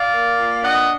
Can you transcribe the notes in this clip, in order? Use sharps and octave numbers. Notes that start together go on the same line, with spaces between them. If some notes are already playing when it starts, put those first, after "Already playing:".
Already playing: D5 F5
A#3
A#2
D4 D#5 F#5